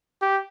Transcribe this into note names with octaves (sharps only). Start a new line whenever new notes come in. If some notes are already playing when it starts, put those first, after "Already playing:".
G4